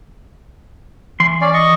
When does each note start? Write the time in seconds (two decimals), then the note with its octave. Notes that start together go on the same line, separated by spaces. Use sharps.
1.20 E3 C6
1.41 C#4 D5
1.53 D#5 C#6